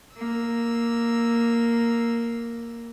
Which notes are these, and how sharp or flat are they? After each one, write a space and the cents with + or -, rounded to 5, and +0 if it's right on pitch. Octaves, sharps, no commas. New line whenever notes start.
A#3 +0 E6 +0